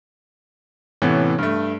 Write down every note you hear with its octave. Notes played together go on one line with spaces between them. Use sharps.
A2 C3 E3 B3 C#4
G2 A3